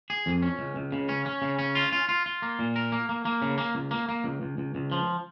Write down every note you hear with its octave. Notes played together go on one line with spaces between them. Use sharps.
G#4
F2
C#4
C#2
C#2
C#3
C#4
C#4
C#3
C#4
F4
F4
F4
F4
A#3
A#2
A#4
A#3
A#3
A#3
C#3
A#3
C#2
A#3
A#3
C#2
C#2
C#2
C#2
F3